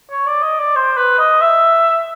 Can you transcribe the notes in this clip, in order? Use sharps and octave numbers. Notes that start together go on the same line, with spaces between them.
C#5
D5
D#5
D5
C5
B4
D#5
E5